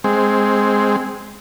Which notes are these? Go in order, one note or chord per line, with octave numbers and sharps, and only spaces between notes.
G#3 C4